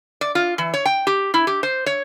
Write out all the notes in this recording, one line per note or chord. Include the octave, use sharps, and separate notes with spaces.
D5
F4
E3
C#5
G5
G4
E4
G4
C5
C#5